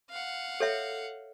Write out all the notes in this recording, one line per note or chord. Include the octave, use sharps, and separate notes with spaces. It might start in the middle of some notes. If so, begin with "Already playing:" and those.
F5 F#5
A4 C#5 E5